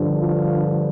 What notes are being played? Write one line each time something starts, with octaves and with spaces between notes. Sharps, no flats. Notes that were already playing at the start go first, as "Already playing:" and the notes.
Already playing: G2 D3 F3
F4